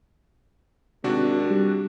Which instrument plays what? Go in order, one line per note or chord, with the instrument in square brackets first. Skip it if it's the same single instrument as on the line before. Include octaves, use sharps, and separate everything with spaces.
[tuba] G#1 [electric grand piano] C3 D4 F#4
[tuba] G3